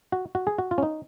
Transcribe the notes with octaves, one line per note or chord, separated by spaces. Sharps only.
F#4
F#4
G#4
F#4
F4
C#4
D#4